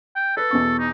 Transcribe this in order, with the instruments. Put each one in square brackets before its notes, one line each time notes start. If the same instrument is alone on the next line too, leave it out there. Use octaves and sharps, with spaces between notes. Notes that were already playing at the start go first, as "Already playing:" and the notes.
[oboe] G5
[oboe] A4 [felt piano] B4
[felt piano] E2 B2 C#6
[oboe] D#4